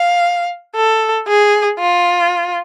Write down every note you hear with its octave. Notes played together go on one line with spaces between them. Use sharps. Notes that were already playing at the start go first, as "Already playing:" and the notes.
Already playing: F5
A4
G#4
F4